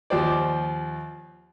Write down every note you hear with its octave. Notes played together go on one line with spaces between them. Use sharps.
D#2 F3 G4 C5 D5